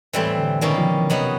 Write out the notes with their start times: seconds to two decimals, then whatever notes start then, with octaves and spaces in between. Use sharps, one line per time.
0.13 A2 E3 G3 C4
0.38 D3
0.61 B2 D#3 G3 A#3 C#4
0.78 F3
0.94 E3
1.10 C3 F#3 B3 D#4